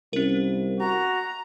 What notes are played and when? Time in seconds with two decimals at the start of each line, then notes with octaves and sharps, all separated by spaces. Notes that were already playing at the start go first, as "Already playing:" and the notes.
0.13 C2 C#4 A#4
0.80 F#4 A#5